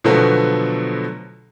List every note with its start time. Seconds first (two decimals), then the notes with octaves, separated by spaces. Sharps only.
0.04 B2 D3 F3 F#3 A3 B3